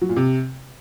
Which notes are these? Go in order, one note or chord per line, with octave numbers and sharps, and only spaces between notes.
F#3
A#2
C3